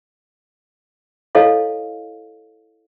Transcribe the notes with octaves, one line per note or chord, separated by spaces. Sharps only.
E4 A4 C#5 D#5 F5